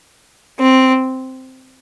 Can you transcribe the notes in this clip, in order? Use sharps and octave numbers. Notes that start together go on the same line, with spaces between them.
C4